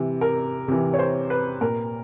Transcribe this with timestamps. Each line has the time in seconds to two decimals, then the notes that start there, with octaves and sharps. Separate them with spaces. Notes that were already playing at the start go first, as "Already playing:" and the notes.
Already playing: C3 E3
0.21 A#4
0.68 C3 E3
0.94 C#5
0.99 C5
1.30 B4
1.61 A#2 A#4